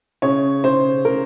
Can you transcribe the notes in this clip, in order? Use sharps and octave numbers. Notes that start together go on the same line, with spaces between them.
C#3 C#5
C#3 C5
C#3 A#4